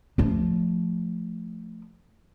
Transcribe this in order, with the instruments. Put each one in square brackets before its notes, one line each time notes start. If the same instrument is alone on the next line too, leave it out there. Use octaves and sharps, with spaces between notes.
[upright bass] F3 A3